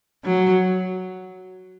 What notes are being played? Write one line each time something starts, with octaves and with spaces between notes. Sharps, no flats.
F#3